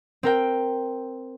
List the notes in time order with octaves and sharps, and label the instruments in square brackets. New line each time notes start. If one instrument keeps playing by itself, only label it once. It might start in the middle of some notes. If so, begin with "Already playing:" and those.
[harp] C4 A#4 G5